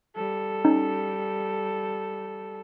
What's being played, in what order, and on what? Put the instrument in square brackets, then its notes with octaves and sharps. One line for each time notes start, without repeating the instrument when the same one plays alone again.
[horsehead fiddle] G3 A4
[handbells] C#4 D#4